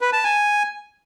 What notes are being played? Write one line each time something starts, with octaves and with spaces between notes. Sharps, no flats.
B4
A5
G#5